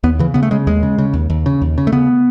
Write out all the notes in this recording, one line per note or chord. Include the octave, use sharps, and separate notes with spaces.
D#2 B3
C#3 E3
C#3 B3
A3
C#3 G#3
D#2 G#3
C#3
C#3
D#2
D#2
C#3
D#2
C#3
A3
C#3 B3